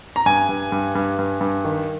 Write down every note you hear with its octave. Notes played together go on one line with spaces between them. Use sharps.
A#5
G2 G#5
G2
G2
G2
G2
G2
D#3